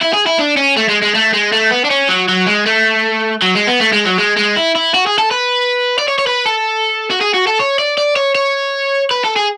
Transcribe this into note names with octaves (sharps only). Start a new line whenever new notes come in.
E4
G#4
E4
D4
C#4
A3
G#3
G#3
A3
G#3
A3
B3
D4
C#4
F#3
F#3
G#3
A3
F#3
G#3
B3
A3
G#3
F#3
G#3
G#3
E4
E4
F#4
G#4
A4
B4
D5
C#5
C#5
B4
A4
F#4
G#4
F#4
A4
C#5
D5
D5
C#5
C#5
B4
A4
G#4